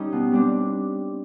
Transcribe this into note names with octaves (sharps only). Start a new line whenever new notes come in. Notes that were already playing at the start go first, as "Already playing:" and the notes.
Already playing: G3 C#4 D#4
B2
G3 C4 D4